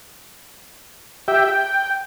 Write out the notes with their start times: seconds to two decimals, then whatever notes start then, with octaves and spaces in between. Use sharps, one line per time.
1.28 G4 E5 G5
1.45 G5